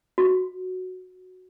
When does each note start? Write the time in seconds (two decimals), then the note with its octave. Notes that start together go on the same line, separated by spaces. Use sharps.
0.18 F#4